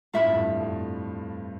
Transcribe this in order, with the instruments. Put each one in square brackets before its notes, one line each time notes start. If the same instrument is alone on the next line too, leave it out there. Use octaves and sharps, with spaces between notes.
[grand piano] A2 [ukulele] F4 A4 E5 B5
[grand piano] G2
F2
G2
F2